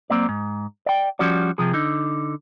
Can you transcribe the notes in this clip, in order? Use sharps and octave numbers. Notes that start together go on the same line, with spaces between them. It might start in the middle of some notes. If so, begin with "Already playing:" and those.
F#3 A#3 C4 D5
G#2
D5 G5
F3 G3 C#4 F#4 D5
C3 F3 G#4
D3 D#4